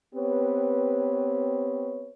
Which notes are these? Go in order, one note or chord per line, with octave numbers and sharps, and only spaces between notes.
B3 C4 G4 B4 C#5